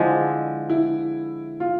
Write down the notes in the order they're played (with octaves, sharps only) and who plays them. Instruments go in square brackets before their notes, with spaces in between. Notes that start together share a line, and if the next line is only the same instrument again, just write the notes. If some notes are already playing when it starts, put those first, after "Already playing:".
Already playing: [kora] D3 F3 G#3 [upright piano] E4
[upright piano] E4
F4